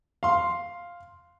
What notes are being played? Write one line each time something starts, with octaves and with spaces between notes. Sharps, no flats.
F5 C6